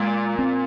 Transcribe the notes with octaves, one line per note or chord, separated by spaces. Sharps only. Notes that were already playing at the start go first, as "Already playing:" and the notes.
Already playing: A#2 G#3
C4